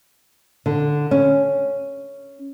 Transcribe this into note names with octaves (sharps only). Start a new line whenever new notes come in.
D3
C#4